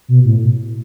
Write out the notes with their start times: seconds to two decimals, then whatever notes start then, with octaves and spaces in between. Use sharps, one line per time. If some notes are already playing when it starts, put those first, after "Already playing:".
0.08 B2
0.24 A2